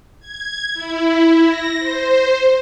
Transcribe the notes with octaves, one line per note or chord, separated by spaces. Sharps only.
G#6
E4
A#6
C5